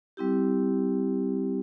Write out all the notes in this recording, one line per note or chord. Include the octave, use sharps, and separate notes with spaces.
G3 C4 E4 G4